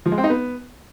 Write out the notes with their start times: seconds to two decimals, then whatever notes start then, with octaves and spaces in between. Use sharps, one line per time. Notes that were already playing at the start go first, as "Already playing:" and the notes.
0.06 F3
0.12 G#3
0.18 C4
0.24 D#4
0.30 B3